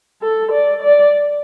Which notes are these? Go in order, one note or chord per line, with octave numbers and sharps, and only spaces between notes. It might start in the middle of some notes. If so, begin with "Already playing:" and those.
A4
D5
D5